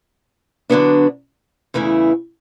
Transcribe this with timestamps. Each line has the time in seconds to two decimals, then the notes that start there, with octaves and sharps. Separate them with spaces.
0.70 D3 F#3 B3 D4
1.74 E2 C#3 E3 A3 E4